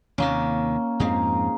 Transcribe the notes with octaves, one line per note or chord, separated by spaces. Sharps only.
D#2 C3 D#3 A#3 C#4
F2 G#2 F3 C4 D#4 G#4